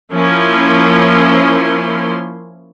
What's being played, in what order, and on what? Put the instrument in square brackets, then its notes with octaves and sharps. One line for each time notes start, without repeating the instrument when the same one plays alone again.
[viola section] F3 A#3 C#4 E4 C6